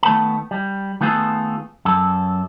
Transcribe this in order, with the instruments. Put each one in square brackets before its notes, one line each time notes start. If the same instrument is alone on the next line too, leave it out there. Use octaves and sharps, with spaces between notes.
[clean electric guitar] D#3 A3 B3 A5
G3
D#3 A3 B3 F4 G#4 A4
F#2 A4